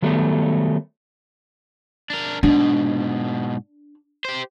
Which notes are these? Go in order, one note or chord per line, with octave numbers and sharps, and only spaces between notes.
D#3 F#3 G3 A3 B3
D4 A#4
G#2 B2 D4
G4 C5